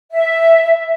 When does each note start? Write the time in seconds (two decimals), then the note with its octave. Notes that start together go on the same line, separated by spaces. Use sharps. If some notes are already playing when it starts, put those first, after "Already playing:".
0.12 E5